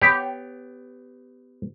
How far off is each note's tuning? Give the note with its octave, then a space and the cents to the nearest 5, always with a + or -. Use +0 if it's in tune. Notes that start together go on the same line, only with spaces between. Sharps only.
B3 +20 G4 +0 C#5 +0